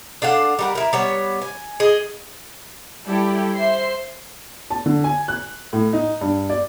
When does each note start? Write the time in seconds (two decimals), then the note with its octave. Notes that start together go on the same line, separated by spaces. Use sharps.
0.22 D4 A4 F5 F#5
0.59 G3 A#4 F#5
0.75 E4 A#4
0.93 G3 B3 C#5
1.42 G#5
1.80 G#4 D#5
3.05 G3 E4 G4 A4 D5 G5
3.56 C5 E5 C6 C7
4.70 A5
4.86 D3
5.04 G#5
5.28 F#6
5.73 A2
5.93 D#4
6.21 G2
6.50 D5